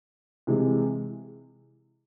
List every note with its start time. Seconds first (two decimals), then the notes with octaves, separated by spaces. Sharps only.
0.47 C3 E3 G#3